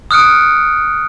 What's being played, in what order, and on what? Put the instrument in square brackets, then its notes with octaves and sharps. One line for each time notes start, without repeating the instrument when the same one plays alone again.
[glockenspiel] D#6 F6 F#6 C#7 D7